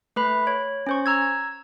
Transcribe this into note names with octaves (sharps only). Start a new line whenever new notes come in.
A3 B4 B5
C#5
C#4 C5 C#6
A#5 E6 G#6